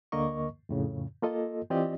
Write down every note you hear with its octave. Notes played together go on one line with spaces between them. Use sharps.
D2 D3 A#3 A#4 D#5 C#6
F2 A2 C#3
A#3 F4 A4 D#5
E3 C4 F4 G4 D5 D#5